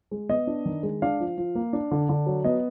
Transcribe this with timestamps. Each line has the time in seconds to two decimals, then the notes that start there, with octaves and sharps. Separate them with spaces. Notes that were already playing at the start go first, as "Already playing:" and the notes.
0.11 G#3
0.29 B3 D#5
0.47 D4
0.65 D#3
0.83 G#3
1.02 D4 F5
1.20 F3
1.37 F3
1.55 A#3
1.73 D4
1.91 D3
2.09 D3
2.26 F#3
2.44 B3 D#5